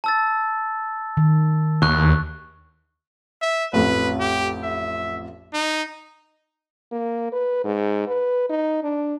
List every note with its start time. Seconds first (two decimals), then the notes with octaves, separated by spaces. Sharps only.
0.04 A5 E6 A6
1.17 D#3
1.82 D#2 C#6 F#6
3.41 E5
3.73 A1 F2 B4
4.19 G4
4.63 E5
5.54 D#4
6.92 A#3
7.33 B4
7.64 G#2
8.07 B4
8.50 D#4
8.83 D4